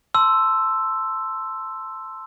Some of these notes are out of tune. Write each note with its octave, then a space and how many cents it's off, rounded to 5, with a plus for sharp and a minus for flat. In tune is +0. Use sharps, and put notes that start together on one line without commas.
A5 +0 C6 +0 E6 +5